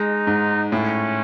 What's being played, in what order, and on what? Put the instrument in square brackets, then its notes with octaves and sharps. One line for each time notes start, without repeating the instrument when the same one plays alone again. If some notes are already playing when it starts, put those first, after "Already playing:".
Already playing: [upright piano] G#3 [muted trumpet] D#4
[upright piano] G#2
[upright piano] A2 [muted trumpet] C#4